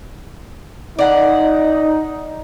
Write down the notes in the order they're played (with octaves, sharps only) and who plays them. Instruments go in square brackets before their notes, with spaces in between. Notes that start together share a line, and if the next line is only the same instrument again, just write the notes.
[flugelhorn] D#4 [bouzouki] D5 F#5